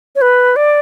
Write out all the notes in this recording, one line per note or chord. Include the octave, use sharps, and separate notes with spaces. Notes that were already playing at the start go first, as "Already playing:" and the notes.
C#5
B4
D5